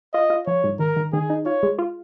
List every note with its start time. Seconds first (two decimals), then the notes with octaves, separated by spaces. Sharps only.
0.14 F4 D#5
0.30 F4
0.47 F3 C#5
0.64 G#2
0.79 D#3 A#4
0.96 D#3
1.13 D#3 G#4
1.30 D#4
1.46 F4 C#5
1.63 G#3
1.79 F4